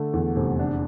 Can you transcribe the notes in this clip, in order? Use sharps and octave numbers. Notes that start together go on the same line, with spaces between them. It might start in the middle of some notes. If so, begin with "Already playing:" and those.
Already playing: D3 A3
E2
F1
D4